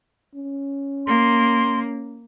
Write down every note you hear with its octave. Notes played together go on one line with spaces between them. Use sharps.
C#4
A#3 C6